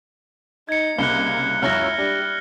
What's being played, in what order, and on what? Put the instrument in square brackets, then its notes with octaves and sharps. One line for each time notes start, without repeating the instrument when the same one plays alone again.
[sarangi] D#4 [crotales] G#6 C#7
[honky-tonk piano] C2 C#3 [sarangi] A#3 [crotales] F#6 C#7 G7
[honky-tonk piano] C#2 F#2 C#5 [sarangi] E4 [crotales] F6 F#6 A#6
[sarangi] G3 [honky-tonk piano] D4